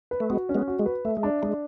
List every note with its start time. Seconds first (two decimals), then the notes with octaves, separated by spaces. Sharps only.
0.11 B4
0.20 A3
0.30 G#3 B3 F#4
0.49 C#4
0.55 G#3 B3
0.68 F#4
0.79 G#3
0.86 B4
1.05 A3 E5
1.17 G#3
1.23 D4
1.42 G#3 D4